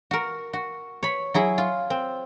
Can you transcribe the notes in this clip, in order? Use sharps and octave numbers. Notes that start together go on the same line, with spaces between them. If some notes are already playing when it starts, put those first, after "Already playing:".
F#4 A#4
F#4
C#5 B5
F#3 E4 G#4
F4
C4